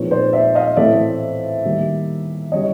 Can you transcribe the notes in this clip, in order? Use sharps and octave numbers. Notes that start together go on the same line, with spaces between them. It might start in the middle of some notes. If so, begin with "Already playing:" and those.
Already playing: A#2 F3 G#3 C4 D#4 B4 C#5
C5 D5
D5 E5
D#5 F5
A2 E3 A3 C4 D5 E5
D#3 G3 A#3
C#3 E3 G3 C#5 D#5